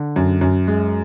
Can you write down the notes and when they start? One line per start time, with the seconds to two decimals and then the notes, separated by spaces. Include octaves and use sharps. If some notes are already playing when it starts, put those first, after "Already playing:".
Already playing: D3
0.16 F#2
0.41 F#2
0.67 G#3